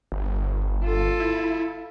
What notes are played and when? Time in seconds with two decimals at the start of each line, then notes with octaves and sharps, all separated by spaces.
0.12 G1
0.85 F4 A4
1.20 E4